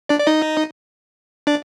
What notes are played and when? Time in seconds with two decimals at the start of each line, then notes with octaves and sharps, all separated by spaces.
0.09 D4 D5
0.20 D5
0.27 D#4 D#5
1.47 D4 D5